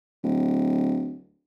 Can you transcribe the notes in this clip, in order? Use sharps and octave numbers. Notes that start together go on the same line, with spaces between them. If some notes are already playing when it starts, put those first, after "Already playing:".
D1